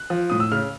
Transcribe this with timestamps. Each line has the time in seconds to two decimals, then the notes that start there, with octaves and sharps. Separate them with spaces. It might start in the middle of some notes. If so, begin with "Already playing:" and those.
Already playing: F#6
0.10 F3
0.30 A2 D#6
0.40 E6
0.52 C#3 F6